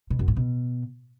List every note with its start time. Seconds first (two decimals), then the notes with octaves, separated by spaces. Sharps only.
0.10 B2
0.19 F#2
0.28 A2
0.36 B2